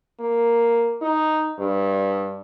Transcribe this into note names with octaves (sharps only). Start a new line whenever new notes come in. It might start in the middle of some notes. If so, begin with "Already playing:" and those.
A#3
D#4
G2